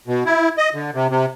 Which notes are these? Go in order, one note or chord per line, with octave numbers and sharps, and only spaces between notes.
B2
E4
D#5
D3
C3
C3